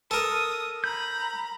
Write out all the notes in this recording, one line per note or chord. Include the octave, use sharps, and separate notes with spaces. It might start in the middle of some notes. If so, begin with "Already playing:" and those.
A4 A#4 D#6
A#5 B5 G6